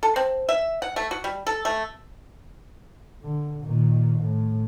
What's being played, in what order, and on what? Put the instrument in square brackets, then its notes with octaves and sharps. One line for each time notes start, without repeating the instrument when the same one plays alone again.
[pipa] A4
C4
E5
F#5
A3
F#4
G3
A4
A3
[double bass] D3
A#2 D#3
A2